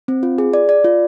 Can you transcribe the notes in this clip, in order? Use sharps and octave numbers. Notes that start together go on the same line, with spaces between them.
C4
F4
G#4
D5
D5
F4